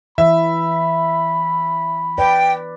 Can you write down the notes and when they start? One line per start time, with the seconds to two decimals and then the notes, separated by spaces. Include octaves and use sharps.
0.18 E3 E5 B5
2.18 B4 D5 G5